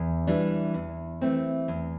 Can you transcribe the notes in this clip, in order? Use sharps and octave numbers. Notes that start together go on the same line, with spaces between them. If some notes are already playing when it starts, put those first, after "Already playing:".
Already playing: E2
E3 G3 D4
E2
E3 A3 C4
E2